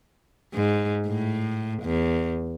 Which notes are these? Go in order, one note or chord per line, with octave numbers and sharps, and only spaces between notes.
G#2
A2
E2